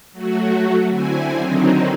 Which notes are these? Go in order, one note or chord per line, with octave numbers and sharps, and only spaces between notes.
F#3 A3 F#4
D3 C4 E4 G#5
D3 D#3 F#3 C4 D#4